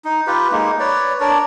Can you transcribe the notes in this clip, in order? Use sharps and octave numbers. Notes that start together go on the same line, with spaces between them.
D#4
F4 G4 B4
G#3 A#3 D#4
B4 C#5 D5
D4 A#4 C#5 D5